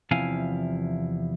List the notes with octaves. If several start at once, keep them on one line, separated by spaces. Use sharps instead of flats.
E2 C3 F3 E4 F5 G#5